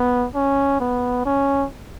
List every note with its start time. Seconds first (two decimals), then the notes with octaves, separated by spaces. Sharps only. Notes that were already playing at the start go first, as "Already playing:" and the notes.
Already playing: B3
0.35 C#4
0.80 B3
1.25 C#4